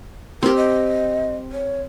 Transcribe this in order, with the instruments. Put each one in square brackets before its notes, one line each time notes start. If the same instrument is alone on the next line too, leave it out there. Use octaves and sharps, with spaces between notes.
[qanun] C4 G4 [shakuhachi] A#4
[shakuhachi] D#5
C#5